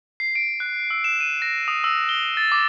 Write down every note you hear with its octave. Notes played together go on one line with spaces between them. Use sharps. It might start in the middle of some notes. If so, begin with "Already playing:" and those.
C7
D7
F#6
E6
E7
D#7
A#6
D#6
E6
G7
A6
D6